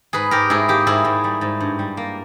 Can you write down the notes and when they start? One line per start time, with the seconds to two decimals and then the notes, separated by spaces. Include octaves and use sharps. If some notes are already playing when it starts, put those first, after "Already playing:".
0.13 G#2 G#4 B4
0.31 G#2 G4 A#4
0.50 G#2 E4 G#4
0.68 A#3 G4
0.87 G#2 E4 G#4
1.05 G#2
1.24 G3
1.41 G#2
1.60 G2
1.79 G3
1.97 A#3